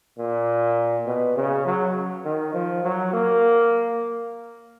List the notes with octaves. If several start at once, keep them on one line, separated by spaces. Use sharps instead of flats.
A#2
B2
C#3
F#3
D#3
F3
F#3
A#3